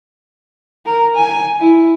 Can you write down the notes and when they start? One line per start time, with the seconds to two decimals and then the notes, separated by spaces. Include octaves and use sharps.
0.86 A#4
1.15 G#5
1.60 E4